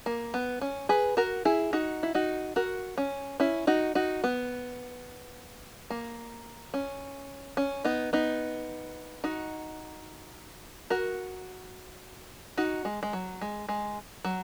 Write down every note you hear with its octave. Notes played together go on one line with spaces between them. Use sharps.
A#3
B3
C#4
G#4 B4
F#4 A#4
E4 G#4
D#4 F#4
E4
D#4 F#4
F#4 A#4
C#4
C#4 E4
D#4 F#4
D#4 F#4
B3
A#3
C#4
C#4
B3 D#4
B3 D#4
D#4 F#4
F#4 A#4
D#4 F#4
G#3
G#3
F#3
G#3
G#3
F#3